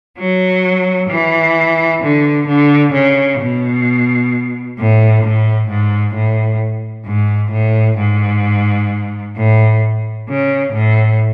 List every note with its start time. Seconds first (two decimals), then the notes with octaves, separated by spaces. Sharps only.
0.17 F#3
1.09 E3
2.01 D3
2.47 D3
2.93 C#3
3.39 B2
4.76 A2
5.22 A2
5.68 G#2
6.14 A2
7.05 G#2
7.52 A2
7.98 G#2
9.35 A2
10.27 C#3
10.73 A2